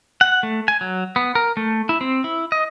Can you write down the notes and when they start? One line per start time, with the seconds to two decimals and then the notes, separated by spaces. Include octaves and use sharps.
0.21 F#5
0.43 A3
0.68 G#5
0.81 F#3
1.16 B3
1.35 A#4
1.57 A3
1.89 E4
2.01 C4
2.24 E4
2.52 D#5